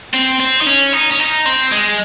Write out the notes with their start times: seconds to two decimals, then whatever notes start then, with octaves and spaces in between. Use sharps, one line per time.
0.14 C4
0.40 C4
0.61 D#4
0.67 C#4
0.93 D#4
1.11 C#4
1.19 D#4
1.46 C4
1.72 G#3